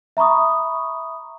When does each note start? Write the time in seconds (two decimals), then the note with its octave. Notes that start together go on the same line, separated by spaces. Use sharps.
0.17 E5 A#5 B5 C#6 D#6